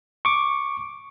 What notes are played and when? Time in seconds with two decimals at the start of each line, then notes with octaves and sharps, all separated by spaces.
0.25 C#6 D6